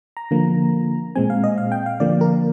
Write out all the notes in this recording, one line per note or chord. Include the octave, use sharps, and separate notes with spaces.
A#5
D3 F3 A#3
A#2 G#3 C4 G#5
F5
D#5
F5
G5
F5
D3 F3 A#3 D5
A#4